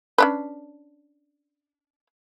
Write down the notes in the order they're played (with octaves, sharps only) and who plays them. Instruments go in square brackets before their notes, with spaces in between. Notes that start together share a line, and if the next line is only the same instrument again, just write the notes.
[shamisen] C#4 D4 B4